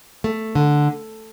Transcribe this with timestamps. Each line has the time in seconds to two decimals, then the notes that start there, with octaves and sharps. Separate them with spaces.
0.24 A3
0.55 D3